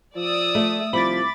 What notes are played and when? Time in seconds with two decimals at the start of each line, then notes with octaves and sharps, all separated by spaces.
0.16 F3 D5 D#6 E6
0.55 A3
0.93 C2 F3 B5 D6 A6